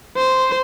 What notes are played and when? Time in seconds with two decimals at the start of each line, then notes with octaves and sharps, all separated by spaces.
0.17 C5